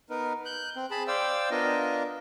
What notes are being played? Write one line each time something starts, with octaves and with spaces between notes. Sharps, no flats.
B3 D#4 A#4 B4
F#6 G6
C4
G#4 A5 B5
C5 D5 F5 G5 E6
B3 D4 F4 A#4 D#5